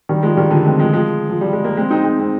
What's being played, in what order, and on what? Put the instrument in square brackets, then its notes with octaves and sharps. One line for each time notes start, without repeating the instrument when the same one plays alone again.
[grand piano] D#3 G3
F3 G#3
D#3 G3
D3 F3
G#3 C4
F3 G#3
F3 G#3
F3
G3
G#3
A#3
G#3 C4
C4 D#4
G#3 C4
G#3 C4